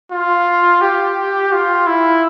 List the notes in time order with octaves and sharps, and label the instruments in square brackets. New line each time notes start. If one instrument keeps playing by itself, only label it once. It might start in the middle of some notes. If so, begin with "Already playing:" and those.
[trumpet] F4
G4
F4
E4